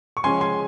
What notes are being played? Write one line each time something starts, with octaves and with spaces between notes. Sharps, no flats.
C#6
C#3 F3 G#3 C#4 G#5 C6
G#5 C6